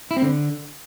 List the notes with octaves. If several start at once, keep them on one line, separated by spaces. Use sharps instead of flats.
E4
C4
D3